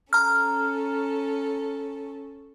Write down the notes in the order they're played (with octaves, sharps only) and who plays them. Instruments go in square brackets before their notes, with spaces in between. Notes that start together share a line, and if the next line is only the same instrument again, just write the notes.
[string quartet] C#4 A4 [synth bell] A#5 F6